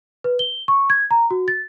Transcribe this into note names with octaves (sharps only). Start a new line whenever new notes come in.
B4
G7
C#6
G#6
A#5
F#4
A6